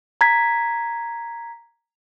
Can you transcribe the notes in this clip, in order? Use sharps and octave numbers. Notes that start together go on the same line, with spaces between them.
A#5 G#6 B6